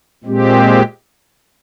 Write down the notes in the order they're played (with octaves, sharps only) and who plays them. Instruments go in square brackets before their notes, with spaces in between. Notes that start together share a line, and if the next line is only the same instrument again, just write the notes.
[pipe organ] A#2 G#3 C4 G4